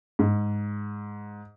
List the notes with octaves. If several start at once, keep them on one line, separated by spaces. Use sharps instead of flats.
G#2